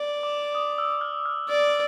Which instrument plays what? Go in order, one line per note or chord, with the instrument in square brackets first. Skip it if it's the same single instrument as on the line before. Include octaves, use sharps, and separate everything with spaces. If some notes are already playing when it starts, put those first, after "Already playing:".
Already playing: [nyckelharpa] D5
[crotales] D6
D#6
E6
F6
F6
[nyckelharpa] D5